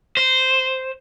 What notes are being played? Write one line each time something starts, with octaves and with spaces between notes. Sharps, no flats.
C5